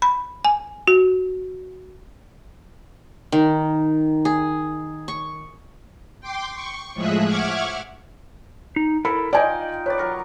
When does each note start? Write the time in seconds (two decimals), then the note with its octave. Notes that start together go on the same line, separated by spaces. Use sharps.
0.02 B5
0.45 G#5
0.88 F#4
3.32 D#3
4.25 G#4
5.08 C#6
6.21 G5 C6 D6
6.54 C#6
6.94 A2 F3 G#3 G#4 E5 F#6
7.26 E5 F#5 C#6 D6 F6 G#6
8.76 D#4
9.05 E4 A4 A#4 B5
9.33 D#4 F4 D5 G5 G#5
9.86 B4 C#5 D5
9.98 F#3 A#4 C#6